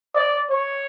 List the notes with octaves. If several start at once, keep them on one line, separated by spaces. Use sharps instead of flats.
D5
C#5